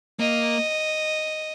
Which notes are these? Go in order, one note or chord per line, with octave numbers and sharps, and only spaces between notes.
A#3 D#5